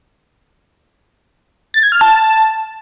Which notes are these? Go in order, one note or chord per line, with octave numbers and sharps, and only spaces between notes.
A6
G#6
F6
A5